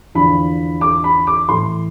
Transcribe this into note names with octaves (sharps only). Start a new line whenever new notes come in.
E2 D3 F3 B5
D6
B5
D6
A2 E3 C6